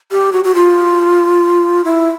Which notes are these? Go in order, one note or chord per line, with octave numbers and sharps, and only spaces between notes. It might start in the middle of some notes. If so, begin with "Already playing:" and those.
G4
F#4
F#4
F4
E4